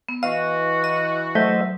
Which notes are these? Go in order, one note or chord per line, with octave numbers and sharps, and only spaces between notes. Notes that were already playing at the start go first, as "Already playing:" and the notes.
B3
E3 F#4 D#5 F5
D#5
F#3 A3 C5 D#5 E5 G6